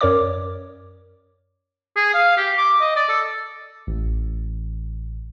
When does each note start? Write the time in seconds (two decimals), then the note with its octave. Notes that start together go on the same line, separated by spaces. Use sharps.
0.01 F#2 A#4 C#5 D5 D6
1.96 G#4
2.14 F5
2.37 G4
2.58 D6
2.81 D#5
2.96 D5
3.09 A4
3.87 A1